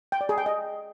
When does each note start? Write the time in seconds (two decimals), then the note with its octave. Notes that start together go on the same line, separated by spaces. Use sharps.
0.12 G5
0.21 D5
0.29 G#4
0.38 G5
0.46 D#5